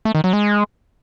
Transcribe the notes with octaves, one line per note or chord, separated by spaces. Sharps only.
A3
D#3
F#3
G#3